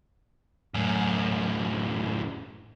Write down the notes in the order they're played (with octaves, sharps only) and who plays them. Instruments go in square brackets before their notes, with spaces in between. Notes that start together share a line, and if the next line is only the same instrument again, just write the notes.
[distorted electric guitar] F#2 A2